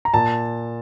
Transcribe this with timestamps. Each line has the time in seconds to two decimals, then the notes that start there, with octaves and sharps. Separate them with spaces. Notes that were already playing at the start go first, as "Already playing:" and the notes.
0.05 A#5
0.14 A#2 A5